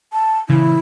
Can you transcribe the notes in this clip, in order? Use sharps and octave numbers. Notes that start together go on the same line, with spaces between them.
A5
A#2 C#3 E3 E4